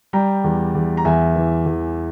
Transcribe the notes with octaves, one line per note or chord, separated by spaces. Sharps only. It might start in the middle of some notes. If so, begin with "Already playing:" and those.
G3 G5 A#5
E2
E2
A#5
E2 E5 G#5
E3
E2